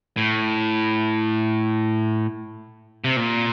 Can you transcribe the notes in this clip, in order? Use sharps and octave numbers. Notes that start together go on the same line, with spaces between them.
A2
C3
A#2